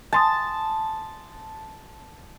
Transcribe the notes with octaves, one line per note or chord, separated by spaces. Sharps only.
G#5 A5 C6 D#6